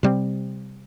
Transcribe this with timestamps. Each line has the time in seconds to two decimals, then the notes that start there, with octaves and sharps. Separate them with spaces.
0.03 C3 G3 C4